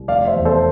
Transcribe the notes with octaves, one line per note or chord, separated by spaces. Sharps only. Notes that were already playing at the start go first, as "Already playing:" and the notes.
Already playing: C2
F1 D5 F5
C5 E5
E2
A4 C5